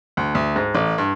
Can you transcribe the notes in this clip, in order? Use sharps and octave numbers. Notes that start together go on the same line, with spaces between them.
D2
D2
G#2
A1
G2